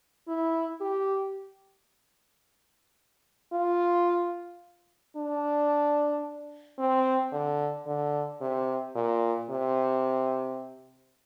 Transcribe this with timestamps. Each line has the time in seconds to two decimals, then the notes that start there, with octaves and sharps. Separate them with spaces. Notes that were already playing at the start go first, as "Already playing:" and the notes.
0.28 E4
0.81 G4
3.53 F4
5.16 D4
6.78 C4
7.32 D3
7.86 D3
8.41 C3
8.95 A#2
9.50 C3